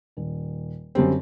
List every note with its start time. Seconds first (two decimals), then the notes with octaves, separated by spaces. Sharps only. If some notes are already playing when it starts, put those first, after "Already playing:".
0.17 D#1
0.95 F#2 D3 G3 C4